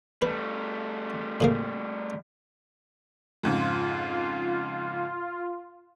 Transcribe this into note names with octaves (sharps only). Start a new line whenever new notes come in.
G3 A3 B4
A2 C#3 A#3
F2 G#2 C#3 F4